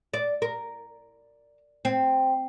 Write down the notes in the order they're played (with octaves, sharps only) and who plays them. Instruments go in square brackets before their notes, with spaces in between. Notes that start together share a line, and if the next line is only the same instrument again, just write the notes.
[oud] D5
A#4
C4